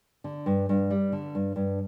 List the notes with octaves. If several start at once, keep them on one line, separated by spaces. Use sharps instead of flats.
D3
G2
G2
G3
D3
G2
G2